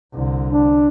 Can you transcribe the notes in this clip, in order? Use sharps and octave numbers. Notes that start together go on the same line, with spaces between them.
C2 D3
D4